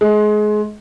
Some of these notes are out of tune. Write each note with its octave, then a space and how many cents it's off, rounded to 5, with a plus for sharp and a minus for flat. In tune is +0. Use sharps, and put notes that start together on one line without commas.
G#3 +25